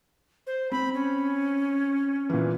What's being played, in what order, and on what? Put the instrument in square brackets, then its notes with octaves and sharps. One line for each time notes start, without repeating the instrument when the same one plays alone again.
[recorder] C5
[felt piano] C4 [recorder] B5
[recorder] C#4
[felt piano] A#2 E3